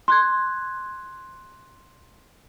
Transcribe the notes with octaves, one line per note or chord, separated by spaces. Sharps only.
C6 F#6 G#6